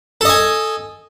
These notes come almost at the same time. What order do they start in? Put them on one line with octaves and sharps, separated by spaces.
A4 D#5 G#5